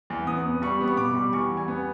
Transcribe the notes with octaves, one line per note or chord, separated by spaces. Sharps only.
E2
B3 D#6
B3
G3 C#6
B3
C#6
B2 D6
G3
E2 C#6
G3
G#5
B3